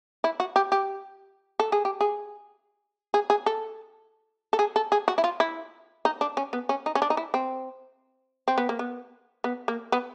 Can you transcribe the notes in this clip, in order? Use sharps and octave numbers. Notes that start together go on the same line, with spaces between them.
E4
F#4
G4
G4
A4
G#4
G4
G#4
G#4
G#4
A4
A4
G#4
A4
G#4
F#4
E4
F4
E4
D#4
D4
C#4
B3
C#4
D#4
C#4
D4
D#4
E4
C4
C4
B3
A#3
B3
B3
A#3
B3